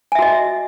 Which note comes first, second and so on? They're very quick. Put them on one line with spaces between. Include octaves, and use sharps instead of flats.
G#5 E5 F#4 D#5